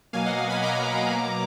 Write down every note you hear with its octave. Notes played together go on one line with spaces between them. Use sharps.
B2 F#3 A#3 F5 G#5
D#5 F#5
F5 G#5
G#5 B5
A#5 D6
B2 F#3 A#3